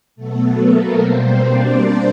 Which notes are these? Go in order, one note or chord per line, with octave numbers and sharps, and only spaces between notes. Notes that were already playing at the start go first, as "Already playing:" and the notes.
B2 F#3 A3 B3 A4
A#3 A#4
B2 G3 A#3 C4 C5
D4 D5